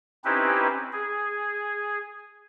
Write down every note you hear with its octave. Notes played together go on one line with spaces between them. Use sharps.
C4 C#4 D#4 E4 G4 B4
G#4